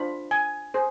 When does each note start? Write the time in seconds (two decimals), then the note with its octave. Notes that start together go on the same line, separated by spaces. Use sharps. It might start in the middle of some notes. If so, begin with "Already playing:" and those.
Already playing: D4 F4 C5 B5
0.31 G#5
0.74 G#4 C5